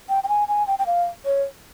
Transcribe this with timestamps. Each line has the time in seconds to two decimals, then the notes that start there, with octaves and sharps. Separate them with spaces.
0.09 G5
0.24 G5
0.29 G#5
0.48 G#5
0.67 G5
0.79 G5
0.86 F5
1.25 C#5